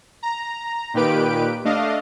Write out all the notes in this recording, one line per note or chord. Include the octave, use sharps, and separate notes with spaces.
A#5
A#2 D#3 G4 B4 D7
A3 D4 D#5 F5